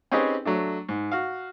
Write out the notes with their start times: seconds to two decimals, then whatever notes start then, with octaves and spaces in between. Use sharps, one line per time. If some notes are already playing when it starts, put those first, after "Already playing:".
0.12 C4 C#4 D#4 G4 G#4 B4
0.45 F#3 A3 D4
0.89 G#2
1.12 F#4 F5